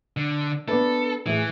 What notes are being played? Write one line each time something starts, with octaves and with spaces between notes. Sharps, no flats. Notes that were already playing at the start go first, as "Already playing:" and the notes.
D3
B3 D4 A4 B4
A2 E3 G#4